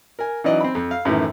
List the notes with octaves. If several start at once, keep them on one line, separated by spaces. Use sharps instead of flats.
A#4 G#5
E3 F#3 C#4 D#4 D5 D#5
C4 B5
F2
F5
F#2 A2 D#3 E3